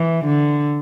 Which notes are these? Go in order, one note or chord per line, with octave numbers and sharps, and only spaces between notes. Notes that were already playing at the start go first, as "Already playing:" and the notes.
Already playing: E3
D3